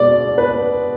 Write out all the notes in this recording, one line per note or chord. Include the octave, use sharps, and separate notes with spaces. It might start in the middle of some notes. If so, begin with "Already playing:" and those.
Already playing: B2 G#3 D5
B4